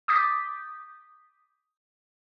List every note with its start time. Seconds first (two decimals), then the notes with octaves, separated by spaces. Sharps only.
0.08 D6 D#6 G6 A6 B6